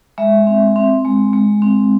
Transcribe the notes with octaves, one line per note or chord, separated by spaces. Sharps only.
G#3 E5
C4
C4
G#3
G#3
C4